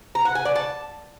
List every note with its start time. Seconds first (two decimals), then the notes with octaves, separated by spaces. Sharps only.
0.15 A#5
0.25 F#5
0.35 G#5
0.45 D5
0.56 A5